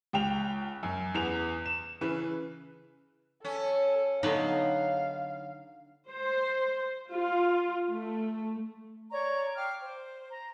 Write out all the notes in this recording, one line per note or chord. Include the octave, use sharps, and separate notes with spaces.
C#2 G5 F7
F#2
E2 B3 F7
E7
C#3 E3 B4
C#4 A4
D3 F#3 B3 D#4 F5
C5
F4
A3
C#5 D5 A#5 C#6
F5 G5 D6 F6
C5
A#5